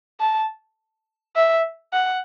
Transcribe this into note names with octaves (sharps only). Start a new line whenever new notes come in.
A5
E5
F#5